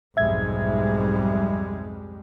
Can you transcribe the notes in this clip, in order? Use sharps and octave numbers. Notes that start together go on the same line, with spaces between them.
B1 F2 G#2 G3 G#3 E5 G#6